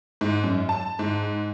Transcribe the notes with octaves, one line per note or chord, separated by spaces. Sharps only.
G#2
F#2
A5
G#2